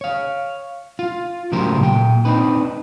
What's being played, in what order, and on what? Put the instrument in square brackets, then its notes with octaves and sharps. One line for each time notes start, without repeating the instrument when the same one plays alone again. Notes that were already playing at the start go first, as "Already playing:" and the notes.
[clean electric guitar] C#5 F5
F4
A2 C#3 F#3 G4 A#4 C5
A#2 G5
C4 D4 D#4 B4